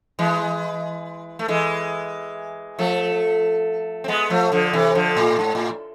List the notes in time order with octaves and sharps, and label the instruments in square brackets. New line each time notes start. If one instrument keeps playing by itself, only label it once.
[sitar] E3 G#3
A3
E3 G#3
F3 A3
C4
G#3 B3
F3 A3
D3 F3
C3 E3
D3 F3
A2
G#2
A2